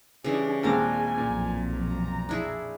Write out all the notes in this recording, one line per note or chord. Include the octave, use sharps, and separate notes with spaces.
C#3 E3 G3 D4 G#4
D#2 A#2 G#3 C4 D4 A#4 F5 G#5
B1 F2 A#2
A#5
D4 E4 G#4